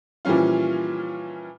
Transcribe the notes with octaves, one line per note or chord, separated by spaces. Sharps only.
A#2 E3 F3 G3 C#4 F4